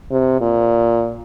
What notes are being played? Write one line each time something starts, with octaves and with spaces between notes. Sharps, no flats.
C3
A#2